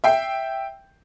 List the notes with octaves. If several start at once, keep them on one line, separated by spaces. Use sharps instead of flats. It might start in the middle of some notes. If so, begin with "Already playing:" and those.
E5 G5 C7